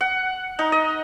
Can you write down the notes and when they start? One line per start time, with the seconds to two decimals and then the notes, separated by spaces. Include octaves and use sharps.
0.01 F#5
0.59 D#4
0.72 D#5